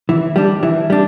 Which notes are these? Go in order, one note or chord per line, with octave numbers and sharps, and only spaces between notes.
E3
G3 D4
E3
G3 D4